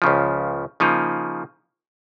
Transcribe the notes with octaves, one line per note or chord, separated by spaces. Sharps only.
C#2 C#3 F3
C#3 F3 A#3 D#4